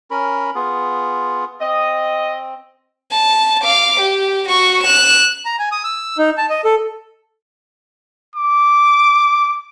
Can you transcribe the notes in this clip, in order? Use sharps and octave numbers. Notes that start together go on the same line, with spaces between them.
C#4 A#4 B5
B3 F4 G#4
C4 D#5
A5
F5 D6
G4
F#4 C#6
F#6 E7
A#5
G#5
D#6
E6
D#4
A5
D#5
A4
D6